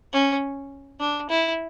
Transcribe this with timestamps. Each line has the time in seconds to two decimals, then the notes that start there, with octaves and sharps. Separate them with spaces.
0.13 C#4
0.99 D4
1.30 E4